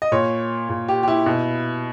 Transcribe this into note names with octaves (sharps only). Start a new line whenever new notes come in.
D#5
A#2 C#5
A#2
G4
G4
E4
B2